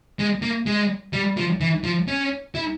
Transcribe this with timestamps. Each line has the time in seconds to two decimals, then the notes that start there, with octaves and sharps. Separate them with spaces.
0.19 G#3
0.42 A#3
0.66 G#3
1.13 G3
1.37 F3
1.61 E3
1.84 F3
2.08 C#4
2.55 E4